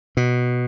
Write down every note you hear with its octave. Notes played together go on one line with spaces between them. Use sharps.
B2